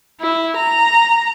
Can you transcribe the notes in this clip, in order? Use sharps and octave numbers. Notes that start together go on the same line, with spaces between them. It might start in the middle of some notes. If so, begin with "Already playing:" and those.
E4
A#5